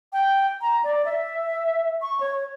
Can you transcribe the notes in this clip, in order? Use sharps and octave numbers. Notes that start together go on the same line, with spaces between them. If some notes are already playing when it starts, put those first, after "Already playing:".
G5
A#5
D5
E5
C#6
C#5